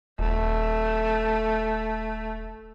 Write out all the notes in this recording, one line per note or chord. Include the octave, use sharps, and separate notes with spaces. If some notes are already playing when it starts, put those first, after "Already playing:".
D#1 A3